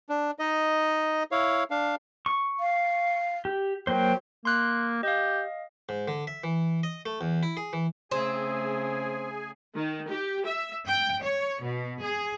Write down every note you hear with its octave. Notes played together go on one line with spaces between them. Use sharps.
D4
D#4 D#5
E4 C#5 F5
D4 F5
C#6
F5
G4
F#3 A#3 C5 G5
A#3 C6 F#6
G4 D#5 F5
G#2
D3
E5
E3
D#5
A3
E2
E4
G#4
E3
C#3 A3 C4 G#4 G#5
D#3
G4
E5
G5
C#5
B2
G#4